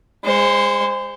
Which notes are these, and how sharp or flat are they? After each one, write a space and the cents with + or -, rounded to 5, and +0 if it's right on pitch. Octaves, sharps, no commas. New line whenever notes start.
G#3 -25 C5 +0